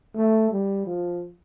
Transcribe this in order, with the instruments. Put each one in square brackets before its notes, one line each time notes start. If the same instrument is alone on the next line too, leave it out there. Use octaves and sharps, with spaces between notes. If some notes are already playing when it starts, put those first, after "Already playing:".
[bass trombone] A3
G3
F3